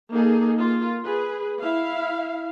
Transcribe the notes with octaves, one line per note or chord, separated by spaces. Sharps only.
A#3 D#4 G#4 A4
A#3 F4
G#4 B4
E4 E5 F5